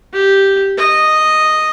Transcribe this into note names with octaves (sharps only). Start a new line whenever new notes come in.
G4
D#5